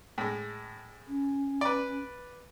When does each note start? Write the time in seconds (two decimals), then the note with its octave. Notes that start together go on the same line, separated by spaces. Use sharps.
0.18 A2 G#3
1.08 C#4
1.61 B4 D5